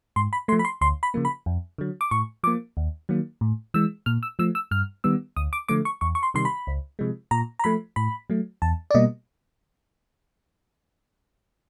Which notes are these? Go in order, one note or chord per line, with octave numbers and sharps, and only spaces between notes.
G#2 C6
B5
F3 A3 C6
B5
C6
D2 C6
B5
C#3 F3 A#3
B5
F2
D3 F#3
D6
A2 C#6
F3 A#3 D6
D#2
D#3 F#3 A#3
A2
E3 G#3 E6
A#2 F6
E6
F3 A3 E6
E6
G2 F6
D#3 G3 B3 E6
D2 D#6
D6
D3 F3 A3 D6
C#6
E2 C#6
C#6
C6
C3 D#3 G3 C6
B5
C#2
C3 F3 G#3
A#2 A#5
A#5
F3 A3 B5
A2 B5
F#3 A3
E2 A5
D5
B2 G3 A#3 D#5